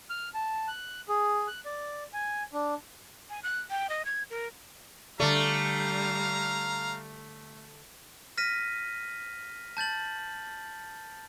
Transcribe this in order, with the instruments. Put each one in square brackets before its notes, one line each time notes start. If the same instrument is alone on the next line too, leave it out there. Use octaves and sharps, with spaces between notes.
[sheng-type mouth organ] F6
A5
F#6
G#4
F#6
D5
G#5
D4
[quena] G#5
F#6
G5
D#5
G#6
A#4
[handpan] D3 D5 [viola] G3 [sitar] A3 [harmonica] F5 A#5
[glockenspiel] F6 A#6 B6 D#7
A5 G6 A6 F#7